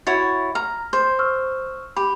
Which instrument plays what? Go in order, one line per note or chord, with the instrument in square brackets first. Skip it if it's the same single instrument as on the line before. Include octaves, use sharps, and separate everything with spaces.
[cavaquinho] E4 F#4 C#5 [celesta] A6
[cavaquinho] A#5 [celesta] F6
[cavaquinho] C5
[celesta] C#6 E6 F6
[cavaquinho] G4 [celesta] B5